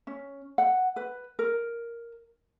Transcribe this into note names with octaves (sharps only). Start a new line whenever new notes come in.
C#4
F#5
B4
A#4